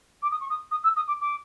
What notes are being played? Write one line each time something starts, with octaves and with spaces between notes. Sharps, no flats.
D6
D#6
C#6
D#6
D#6
E6
D#6
D6
D6